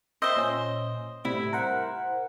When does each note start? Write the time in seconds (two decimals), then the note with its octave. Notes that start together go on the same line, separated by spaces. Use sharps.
0.22 C5 D#5 E5 G5 C6
0.37 A#2 C#4
1.25 A2 C3 G3 E4
1.53 A#4 C5 F#5